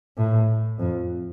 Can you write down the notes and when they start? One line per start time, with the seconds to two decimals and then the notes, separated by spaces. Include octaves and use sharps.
0.17 A2
0.79 F2